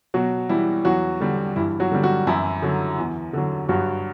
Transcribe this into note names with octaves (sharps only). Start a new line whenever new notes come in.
B2 F#3 F#4
E3 G3 E4
E2 F#3 F#4
D3 G3
G2 E3 E4
F#3 F#4
D3 G3
F#3 F#4
F#2 E3 E4
D3 F#3
E2
D3 F#3
G2 F#3 F#4